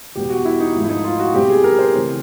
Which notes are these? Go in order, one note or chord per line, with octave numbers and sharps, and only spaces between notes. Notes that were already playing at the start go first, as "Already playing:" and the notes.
E2 B2 G3 B3 G4
F#4
E4
D#4
G#2 F3 A3
E4
D#4
F4
F#4
B2 G3 C4 G4
G#4
A#4
C5
C#3 E3 A3 C4